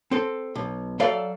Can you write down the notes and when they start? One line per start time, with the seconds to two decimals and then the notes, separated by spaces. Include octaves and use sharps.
0.11 C4 A4
0.55 B1
1.00 F#3 A4 D5 E5 F5